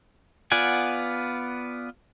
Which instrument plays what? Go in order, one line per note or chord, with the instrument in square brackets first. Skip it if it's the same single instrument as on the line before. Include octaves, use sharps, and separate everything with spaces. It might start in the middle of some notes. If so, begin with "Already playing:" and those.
[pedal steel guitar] B3 F4 D5 F#5 G#5